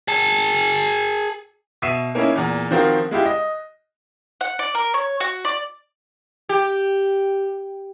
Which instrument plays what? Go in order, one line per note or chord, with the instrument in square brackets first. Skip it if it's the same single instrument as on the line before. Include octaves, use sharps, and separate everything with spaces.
[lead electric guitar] G#4 A5
[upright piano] B2 E5 C7 D#7 E7
A#3 C#4 D#4 E4
E2 A#2
D#3 F3 C4 F4 F#4 A#4
G#3 E4 F4 G4
D#5
[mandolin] F#5
D5
A#4
C#5
F#4
D5
[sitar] G4